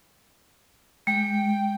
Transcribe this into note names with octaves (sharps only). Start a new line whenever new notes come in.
G#3 G5